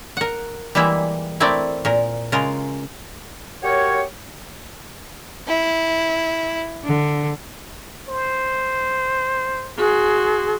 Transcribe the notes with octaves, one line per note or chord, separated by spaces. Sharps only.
A#4 F#5
E3 G3 G#3 A#3 E4 E5
A3 C4 E4 A#4 D5
A#2 A#4
C#3 G#3 F4 A#4
F#4 G4 A#4 C#5
E4
D3
C5
F#4 G#4 C6